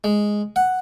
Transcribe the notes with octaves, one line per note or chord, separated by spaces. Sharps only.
G#3
F#5